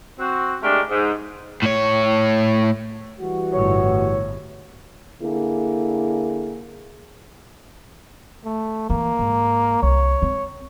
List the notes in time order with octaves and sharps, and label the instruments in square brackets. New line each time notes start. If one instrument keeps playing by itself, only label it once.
[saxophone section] C4 F#4
G#3 A3 D4 G4 A#4
G#2
[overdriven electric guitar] A2 C#5
[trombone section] E3 G3 F#4
[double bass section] G1 A2 [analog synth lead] C#5
[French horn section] D3 A#3 E4 G#4
[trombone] A3
[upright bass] E3 [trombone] A#3
[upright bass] G#2
[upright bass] C2 [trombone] C#5
[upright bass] C4